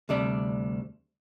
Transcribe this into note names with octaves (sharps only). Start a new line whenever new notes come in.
D2 C3 G3 D4 D5